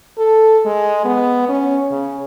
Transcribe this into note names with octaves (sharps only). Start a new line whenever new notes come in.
A4
G#3
B3
C#4
C#3